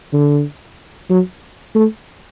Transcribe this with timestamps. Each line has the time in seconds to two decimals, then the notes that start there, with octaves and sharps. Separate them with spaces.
0.13 D3
1.10 F#3
1.75 A3